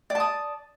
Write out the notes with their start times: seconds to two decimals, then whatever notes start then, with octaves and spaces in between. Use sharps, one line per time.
0.10 D5
0.15 A5
0.20 D#6